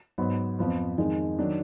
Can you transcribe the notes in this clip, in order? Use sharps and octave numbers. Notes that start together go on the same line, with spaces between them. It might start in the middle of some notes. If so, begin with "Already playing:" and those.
G#2 F#3 B3
F2 F3 B3
F2 D#3 G#3 D#4
D#3 F#3 D4